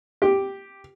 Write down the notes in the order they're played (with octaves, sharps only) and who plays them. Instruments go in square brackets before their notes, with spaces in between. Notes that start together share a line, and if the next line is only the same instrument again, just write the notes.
[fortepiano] G4